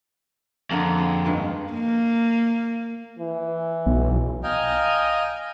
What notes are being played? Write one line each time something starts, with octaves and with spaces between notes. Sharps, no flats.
F2 D3 A#3 G#4
G#4
G2 D#3 G#3
A#3
E3
B1
D#5 F5 G5 G#5 A#5